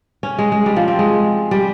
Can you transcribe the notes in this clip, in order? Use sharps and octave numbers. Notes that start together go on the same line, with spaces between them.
C#4
G#3
G#3
G3
F3
C4
G#3
G3